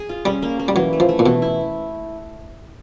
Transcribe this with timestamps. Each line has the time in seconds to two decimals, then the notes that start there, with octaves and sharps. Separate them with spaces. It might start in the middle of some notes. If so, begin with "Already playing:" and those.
Already playing: G#4
0.09 F4
0.25 G3 C#4
0.42 A#3
0.59 A#3
0.68 G3
0.76 E3 F#3
0.93 A3
1.00 F3
1.09 A3
1.19 A#2
1.25 B2 E3
1.42 E4